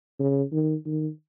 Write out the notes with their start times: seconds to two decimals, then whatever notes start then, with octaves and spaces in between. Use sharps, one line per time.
0.20 C#3
0.52 D#3
0.86 D#3